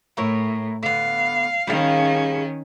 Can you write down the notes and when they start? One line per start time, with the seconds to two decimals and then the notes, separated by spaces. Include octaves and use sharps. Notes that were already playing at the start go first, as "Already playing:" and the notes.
0.17 A2 E4 A#4 C#5
0.83 D3 B3 F5
1.67 D#3 G3 C#4 G#4 F5